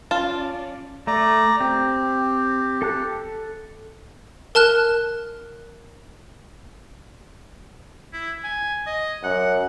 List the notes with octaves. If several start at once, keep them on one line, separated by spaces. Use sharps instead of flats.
C#4 F4 D5 A5
A3 D5 A#5
C4 G4
A4 A5 F#6
A#4 A5 F6 F#6
E4
G#5
D#5
F#2 F#5